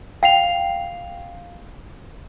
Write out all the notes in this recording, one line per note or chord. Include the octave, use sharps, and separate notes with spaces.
F5 G5 C7 F7